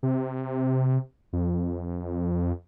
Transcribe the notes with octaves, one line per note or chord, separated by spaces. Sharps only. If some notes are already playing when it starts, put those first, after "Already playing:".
C3
F2